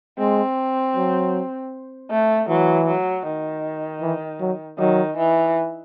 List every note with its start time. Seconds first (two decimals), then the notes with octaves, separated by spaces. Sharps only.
0.19 G#3 C4
0.96 F#3
2.10 A3
2.49 E3 F#3
2.87 F#3
3.26 D#3
4.02 E3
4.41 F#3
4.79 D#3 F#3
5.18 E3